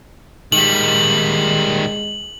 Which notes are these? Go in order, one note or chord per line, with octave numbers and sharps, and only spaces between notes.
D#3 G3 G#3 F#7